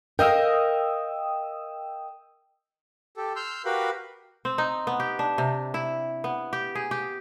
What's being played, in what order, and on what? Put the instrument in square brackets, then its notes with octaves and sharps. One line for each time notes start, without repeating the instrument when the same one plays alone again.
[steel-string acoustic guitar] A#4 D#5 F5 [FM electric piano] G5 D#6 E6
[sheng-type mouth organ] G4 A4
C6 E6 F6 G6
F#4 G4 A#4 B4 F5 B5
[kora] C4
D#4
B3
G4
D4
C3
E4
B3
G4
G#4
G4